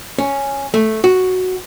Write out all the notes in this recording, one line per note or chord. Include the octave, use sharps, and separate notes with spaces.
C#4
A3
F#4